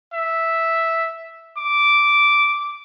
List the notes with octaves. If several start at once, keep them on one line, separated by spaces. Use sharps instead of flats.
E5
D6